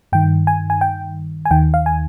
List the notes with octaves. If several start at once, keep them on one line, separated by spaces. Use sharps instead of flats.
G2 D#3 G5
G#5
G#5
G5
G#5
D#2 D#3 G5
F5
G#5